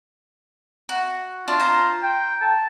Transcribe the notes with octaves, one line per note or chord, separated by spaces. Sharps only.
F#4
D4 F4
C5 A#5
G5
A5